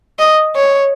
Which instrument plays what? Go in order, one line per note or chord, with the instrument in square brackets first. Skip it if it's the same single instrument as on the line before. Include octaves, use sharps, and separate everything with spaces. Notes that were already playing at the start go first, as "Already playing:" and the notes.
[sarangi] D#5
C#5